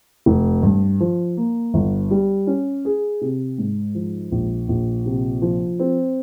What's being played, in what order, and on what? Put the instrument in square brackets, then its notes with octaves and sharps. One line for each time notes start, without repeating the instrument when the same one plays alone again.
[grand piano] F1
G2
F3
A#3
G1
G3
C#4
G#4
C3
G#2
F3
A#1
A#1
C3
F3
C4